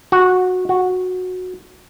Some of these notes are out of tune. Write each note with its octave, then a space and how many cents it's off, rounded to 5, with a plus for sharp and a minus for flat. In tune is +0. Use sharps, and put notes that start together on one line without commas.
F#4 -15
F#4 -15